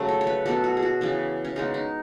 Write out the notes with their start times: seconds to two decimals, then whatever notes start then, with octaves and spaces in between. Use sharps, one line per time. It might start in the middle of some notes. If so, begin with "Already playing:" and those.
Already playing: C#3 F#3 A3
0.09 A4
0.21 C#5
0.27 B4
0.46 B2 F#3 B3 A4
0.64 F#4
0.77 G#4
0.83 F#4
1.01 C#3 E3 B3
1.45 C#4
1.56 C#3 G#3 B3 D#4
1.74 D#4